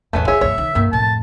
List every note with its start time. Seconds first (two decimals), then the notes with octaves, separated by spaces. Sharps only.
0.13 A1 E2 A3 B3 C#4
0.28 E4 G#4 C#5 E5
0.41 A#1 G2 C#5
0.58 D#3
0.75 G2 D#3 A#3
0.93 F2 A2 A5